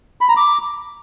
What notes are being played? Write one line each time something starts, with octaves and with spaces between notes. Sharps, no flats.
B5
A#5
D6